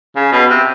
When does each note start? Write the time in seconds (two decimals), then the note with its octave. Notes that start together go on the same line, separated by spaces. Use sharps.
0.16 C#3
0.32 B2
0.50 C3